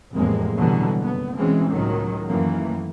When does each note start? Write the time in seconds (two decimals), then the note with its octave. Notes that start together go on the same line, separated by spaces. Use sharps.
0.15 F1 E2 A2 G#3 A#3 C4
0.58 B2 D3 E3 F#3 G3
1.00 F#1 B3
1.36 B2 E3 G#3 C4 C#4
1.70 C#2 A2 D#3 F#3
2.28 F#2 D#3 E3 A3 A#3